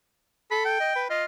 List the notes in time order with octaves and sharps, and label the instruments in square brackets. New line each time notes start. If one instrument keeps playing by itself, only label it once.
[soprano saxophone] A4 [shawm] B5
[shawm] G5
[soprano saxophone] D#5
B4
[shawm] F4 [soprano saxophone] D#5